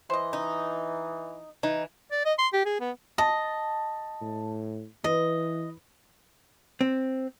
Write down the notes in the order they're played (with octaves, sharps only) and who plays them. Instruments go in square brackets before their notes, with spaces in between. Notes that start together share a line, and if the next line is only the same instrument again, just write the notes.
[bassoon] E3 [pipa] C5 D#5
[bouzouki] D#4
[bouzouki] E3 [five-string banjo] D#4
[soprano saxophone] D5
D#5
C6
G4
G#4
B3
[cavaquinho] D#5 [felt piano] A5
[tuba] A2
[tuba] E3 [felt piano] B4 [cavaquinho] D#5
[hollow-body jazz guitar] C4